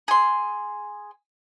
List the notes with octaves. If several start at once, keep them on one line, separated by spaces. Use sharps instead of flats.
G#4 C6